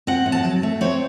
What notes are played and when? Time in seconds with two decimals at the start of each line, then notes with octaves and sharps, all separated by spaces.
0.07 C4 F#5
0.26 A2
0.32 A5
0.45 F#3
0.63 A3
0.81 C4 C#5